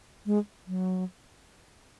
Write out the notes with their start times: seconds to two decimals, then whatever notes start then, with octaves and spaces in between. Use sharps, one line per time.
0.26 G#3
0.67 F#3